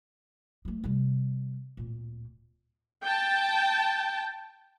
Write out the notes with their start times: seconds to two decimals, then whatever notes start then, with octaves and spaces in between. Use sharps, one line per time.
0.65 F#3 A3
0.84 C3 G3
1.77 D1 A#2
3.03 G5 A5